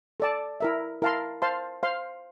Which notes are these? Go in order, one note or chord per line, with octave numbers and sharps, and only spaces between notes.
A4 D5 A5
E4 A#4 E5
E4 A#4 F5 A5 C6
C5 F5 A5 C6
C5 F5 C6